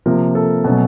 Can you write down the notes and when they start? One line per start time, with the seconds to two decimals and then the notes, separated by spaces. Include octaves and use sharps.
0.06 C3 F3 A#3 A#4
0.35 A4
0.64 B2 F#3 A3 C#4